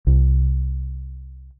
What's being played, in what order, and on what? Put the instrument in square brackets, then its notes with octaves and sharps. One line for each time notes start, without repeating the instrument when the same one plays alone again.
[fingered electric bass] C2